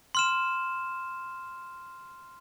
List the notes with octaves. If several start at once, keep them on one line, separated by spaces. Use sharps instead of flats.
C6 F6 E7